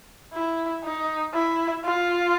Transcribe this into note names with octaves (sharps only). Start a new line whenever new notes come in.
E4
D#4
E4
F4